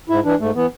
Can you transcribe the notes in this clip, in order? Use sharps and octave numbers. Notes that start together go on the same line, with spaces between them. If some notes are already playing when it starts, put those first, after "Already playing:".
G#2 E4
E3 D4
G#2 A3
E3 B3